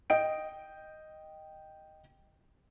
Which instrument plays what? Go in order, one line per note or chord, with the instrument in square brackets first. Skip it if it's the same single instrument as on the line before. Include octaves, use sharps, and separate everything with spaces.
[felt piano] D#5 G5 D7